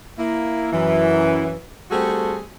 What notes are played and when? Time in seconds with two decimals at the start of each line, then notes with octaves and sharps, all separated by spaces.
0.18 A#3 E4
0.72 F#2 E3
1.91 G3 A3 C4 F#4 G#4 A4